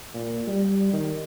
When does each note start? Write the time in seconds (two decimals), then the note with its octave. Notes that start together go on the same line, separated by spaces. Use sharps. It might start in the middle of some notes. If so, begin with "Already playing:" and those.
0.14 A#2
0.47 G3
0.93 D#3